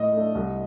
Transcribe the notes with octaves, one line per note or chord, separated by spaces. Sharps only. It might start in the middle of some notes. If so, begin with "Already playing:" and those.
Already playing: A2 D#5
A3 D4
C2